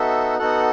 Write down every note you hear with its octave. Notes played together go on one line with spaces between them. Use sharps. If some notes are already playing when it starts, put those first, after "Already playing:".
Already playing: B3 D#4 F#4 A4 E5
B3 D#4 F#4 A4 F#5